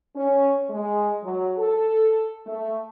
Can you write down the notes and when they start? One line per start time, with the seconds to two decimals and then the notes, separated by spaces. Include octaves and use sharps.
0.15 C#4
0.70 G#3
1.24 F#3
1.58 A4
2.46 A3